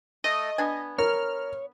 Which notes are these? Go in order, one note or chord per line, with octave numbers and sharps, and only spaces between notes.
A3 D#5
B3 D4 G#5
A#4 C#5 F6